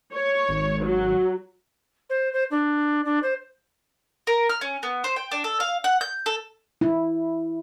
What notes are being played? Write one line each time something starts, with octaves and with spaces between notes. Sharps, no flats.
C#5
G#1
F#3
C5
C5
D4
D4
C5
A#4
F6
C#4
B3
C5
G5
D4
A4
F5
F#5
G6
A4
E4